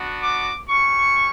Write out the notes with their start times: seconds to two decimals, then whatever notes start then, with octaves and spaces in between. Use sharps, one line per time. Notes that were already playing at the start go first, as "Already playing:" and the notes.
Already playing: B3 D4 F#4
0.23 D6
0.68 C#4 G4 C#6